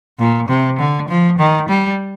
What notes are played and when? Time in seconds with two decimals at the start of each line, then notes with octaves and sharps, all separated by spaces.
0.19 A#2
0.48 C3
0.78 D3
1.08 F3
1.38 D#3
1.68 G3